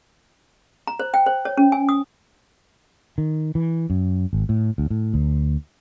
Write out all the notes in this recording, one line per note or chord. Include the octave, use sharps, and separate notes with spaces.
A#5
C5
G5
C5
C#5
C#4
G#5
D#6
D#3
E3
F#2
G#1
A2
D2
A2
D2